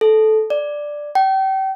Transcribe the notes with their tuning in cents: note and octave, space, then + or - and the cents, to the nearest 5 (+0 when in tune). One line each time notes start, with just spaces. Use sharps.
A4 -15
D5 +5
G5 -35